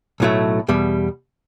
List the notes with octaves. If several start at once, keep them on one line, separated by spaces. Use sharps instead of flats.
B1 A2 F#3 A3
E2 B2 G3